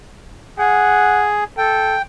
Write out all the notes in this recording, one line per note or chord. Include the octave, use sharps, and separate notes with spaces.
G#4 F#5
A4 G5